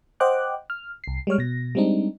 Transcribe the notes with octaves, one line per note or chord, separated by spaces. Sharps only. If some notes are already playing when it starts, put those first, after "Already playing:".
C5 D#5 F#5 G5 D6 F#6
F6
C2 C7
G3 G#3 C#5 F6
B2 A#6
G3 G#3 C4 D4 D#4